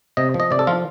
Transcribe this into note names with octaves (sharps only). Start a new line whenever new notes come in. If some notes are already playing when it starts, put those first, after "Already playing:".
C3 D#5
F3
D#5
C3 D5
A4
F3 F4